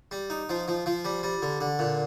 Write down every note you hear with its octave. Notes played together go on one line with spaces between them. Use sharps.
G3
D#4
F3
F3
F3
G3
G3
D3
D3
A#2